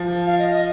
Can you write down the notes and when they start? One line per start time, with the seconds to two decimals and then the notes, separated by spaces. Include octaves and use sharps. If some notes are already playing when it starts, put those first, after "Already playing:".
Already playing: F3
0.27 F5
0.39 D#5
0.50 D#5